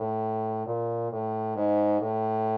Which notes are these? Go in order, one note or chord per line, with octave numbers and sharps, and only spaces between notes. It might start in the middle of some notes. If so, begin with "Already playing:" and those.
Already playing: A2
A#2
A2
G#2
A2